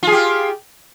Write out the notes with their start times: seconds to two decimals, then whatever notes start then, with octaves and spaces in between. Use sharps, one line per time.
0.03 F4
0.07 G#4
0.12 G4